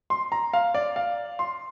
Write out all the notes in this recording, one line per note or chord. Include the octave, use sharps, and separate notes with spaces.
C6
A#5
F5
D5
F5
C6